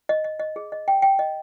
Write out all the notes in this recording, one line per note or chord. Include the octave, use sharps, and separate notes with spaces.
D#5
D#5
D#5
G#4
D#5
G5
G5
D#5